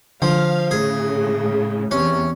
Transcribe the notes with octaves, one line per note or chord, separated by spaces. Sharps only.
D3 F3 F5
A2 C#3 G#4
E2 C3 C#4